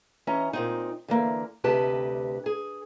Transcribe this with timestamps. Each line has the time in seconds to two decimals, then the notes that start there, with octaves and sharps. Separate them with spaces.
0.27 E3 C#4 D#5 A#5
0.53 A#2 C4 D#4
1.08 D3 E3 A#3
1.64 D2 C3 G4 B4 D#5 A5
2.46 G#4